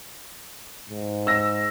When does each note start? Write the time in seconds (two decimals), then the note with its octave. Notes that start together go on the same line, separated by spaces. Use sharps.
0.89 G#2
1.27 E6 A#6